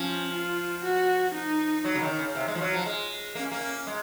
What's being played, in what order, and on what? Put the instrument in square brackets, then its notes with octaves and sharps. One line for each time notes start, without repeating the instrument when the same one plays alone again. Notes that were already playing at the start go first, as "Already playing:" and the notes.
Already playing: [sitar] F3 [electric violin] C#4
[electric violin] F4
F#4
D#4
[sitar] F#3
C#3
D#3
C#3
C3
G#3
F3
F#3
F3
G#3
[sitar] A#3 [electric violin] C#4
[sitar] A#3
G#3